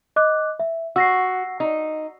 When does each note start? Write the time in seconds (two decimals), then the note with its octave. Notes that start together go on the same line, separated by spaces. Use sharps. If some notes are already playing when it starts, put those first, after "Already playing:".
0.16 D#5 D6 F#6
0.60 E5
0.96 F#4 E6 A#6 C7
1.60 D#4